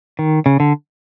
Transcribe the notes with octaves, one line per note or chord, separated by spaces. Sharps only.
D#3
C#3
D3